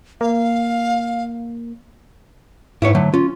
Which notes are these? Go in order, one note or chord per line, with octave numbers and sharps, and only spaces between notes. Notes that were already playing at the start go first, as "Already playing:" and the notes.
A#3 F5
G#2 E4 B4 C#5
D3 F#3 A3
C#4 F4